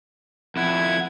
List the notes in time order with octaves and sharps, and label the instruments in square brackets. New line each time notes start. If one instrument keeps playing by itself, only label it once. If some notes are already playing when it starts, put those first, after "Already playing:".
[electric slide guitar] F2 E4 [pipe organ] F#5 G#6